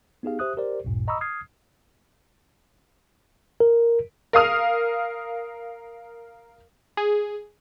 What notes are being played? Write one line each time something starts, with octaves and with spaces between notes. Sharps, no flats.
B3 D#4 G4 G#4 F5
G4 C5 E5 D#6 F#6
G4 A#4 C5 D5
A1 D2 G2 A#2
D#5 A#5 B5 C#6 D#6 E6
D#6 F6 G#6 C7
A#4
A#4 F5 D#6 F6
G#4